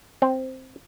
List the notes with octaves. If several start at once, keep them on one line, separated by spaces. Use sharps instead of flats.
C4